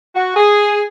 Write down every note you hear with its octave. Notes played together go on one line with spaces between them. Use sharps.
F#4
G#4